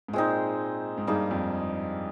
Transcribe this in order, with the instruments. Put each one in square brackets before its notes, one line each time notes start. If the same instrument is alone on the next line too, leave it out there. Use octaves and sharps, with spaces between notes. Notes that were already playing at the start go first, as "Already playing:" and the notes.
[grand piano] G#2
[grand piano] A#2 [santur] G#3 C4 D#4
[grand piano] G#2
[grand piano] G2 [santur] A#3 D#4 G#4
[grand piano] F2